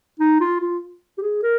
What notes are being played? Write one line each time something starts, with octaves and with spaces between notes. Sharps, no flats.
D#4
F4
F4
G4
G#4
A#4